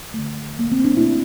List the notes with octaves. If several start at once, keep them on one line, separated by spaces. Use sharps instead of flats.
D3 A3
A#3
C4
D4
A#2 A3 E4